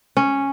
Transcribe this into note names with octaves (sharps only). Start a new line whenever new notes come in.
C#4